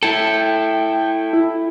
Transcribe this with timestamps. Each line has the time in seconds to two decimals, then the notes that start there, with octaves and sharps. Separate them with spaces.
0.03 E4 A4 G5
1.33 E4